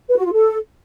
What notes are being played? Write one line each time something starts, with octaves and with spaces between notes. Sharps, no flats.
B4
F#4
F4
A4